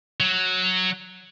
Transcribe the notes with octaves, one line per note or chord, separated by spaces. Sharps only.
F#3